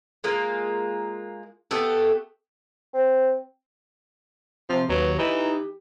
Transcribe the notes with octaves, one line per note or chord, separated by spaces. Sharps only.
G#3 A#3 F4 A#4
A3 B3 G4 A4
C4
C3 F3
D#2 F#3 B4
E3 D#4 G4